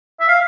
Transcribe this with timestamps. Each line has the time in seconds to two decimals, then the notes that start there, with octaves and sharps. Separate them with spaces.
0.21 E5
0.28 F5